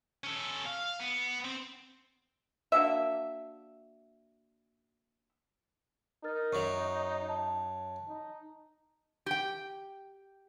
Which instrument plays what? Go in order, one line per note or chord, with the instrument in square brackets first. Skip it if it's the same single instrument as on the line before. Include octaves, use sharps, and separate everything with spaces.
[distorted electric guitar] C#4 A4
F5
B3
C4
[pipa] A#3 D4 F#4 E5
[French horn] D#4 [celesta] A#4 F6 A6
[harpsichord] F#2 F#3 [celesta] C#6
[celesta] A5
[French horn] D#4
[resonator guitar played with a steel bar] G4 G5